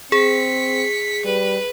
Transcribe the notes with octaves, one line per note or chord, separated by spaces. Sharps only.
C4 G#4 B6 C#7
G3 B4